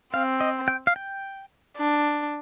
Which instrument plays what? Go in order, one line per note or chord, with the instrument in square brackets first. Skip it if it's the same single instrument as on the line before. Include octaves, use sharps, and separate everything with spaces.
[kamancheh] C4 [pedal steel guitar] F5
[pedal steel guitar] D#5
G5
F5
G5
[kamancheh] D4